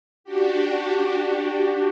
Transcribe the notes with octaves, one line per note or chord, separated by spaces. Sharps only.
D4 F#4 G4